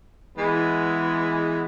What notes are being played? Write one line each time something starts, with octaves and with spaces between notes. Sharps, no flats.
E3 G#3 B3